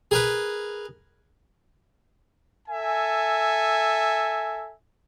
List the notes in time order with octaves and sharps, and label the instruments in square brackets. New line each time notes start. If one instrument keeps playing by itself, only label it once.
[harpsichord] G#4 A#4 B4
[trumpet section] A4 E5 G#5